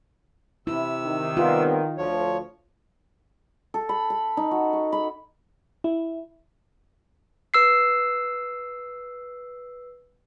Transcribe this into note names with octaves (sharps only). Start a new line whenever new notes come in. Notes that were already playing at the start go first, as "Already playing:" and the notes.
C3 E4 E6
D#3
G3 B3 C4 F4
D2 F3 C#5
A4
B5
B5
D#4
F#4
C#6
B5
E4
B4 E6 C7